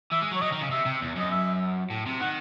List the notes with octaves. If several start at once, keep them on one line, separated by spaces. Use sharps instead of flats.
E3 E5
G#3
F#3
C#5
F#3 D#5
D#3
C#3
C3 E5
C3
E2
F#2 D#5
E5
A2
C3
D#3 F#5